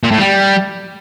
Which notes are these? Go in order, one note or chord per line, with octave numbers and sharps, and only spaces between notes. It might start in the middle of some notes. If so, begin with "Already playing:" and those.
A#2
A2
G3